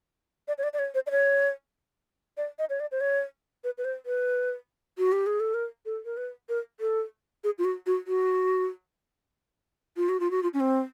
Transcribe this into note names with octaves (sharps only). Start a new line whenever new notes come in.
D5
C#5
D5
D5
C#5
C5
D5
C#5
D5
D#5
C#5
D5
C5
C#5
B4
B4
C5
B4
F#4
G4
G#4
A4
A#4
A4
A#4
B4
A#4
A4
G#4
F4
F#4
F#4
F#4
F4
F#4
F4
F#4
F4
C#4
C4